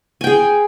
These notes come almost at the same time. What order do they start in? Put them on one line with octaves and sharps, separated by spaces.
G#5 G5 G#4